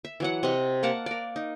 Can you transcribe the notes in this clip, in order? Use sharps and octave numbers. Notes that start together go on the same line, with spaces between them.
E5
E3 F#3 F#5
C3 D#5
A#3 A#4 F#5 A5
A#4 D5
D#4